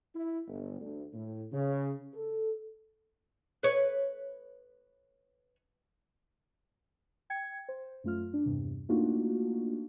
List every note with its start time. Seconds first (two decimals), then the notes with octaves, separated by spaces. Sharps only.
0.15 E4
0.47 G1
0.80 D2
1.13 A2
1.52 C#3
2.13 A4
3.63 B4 C#5
7.30 G5 G#6 C#7
7.69 C5
8.04 F#2 A3 F4 F6
8.33 D4
8.46 E2 G2 C3
8.89 A3 A#3 D4 D#4 F4 F#4